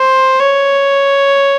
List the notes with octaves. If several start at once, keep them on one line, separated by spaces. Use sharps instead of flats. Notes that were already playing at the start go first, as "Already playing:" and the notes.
Already playing: C5
C#5